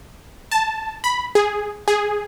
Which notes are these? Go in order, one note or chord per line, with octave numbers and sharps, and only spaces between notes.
A5
B5
G#4
G#4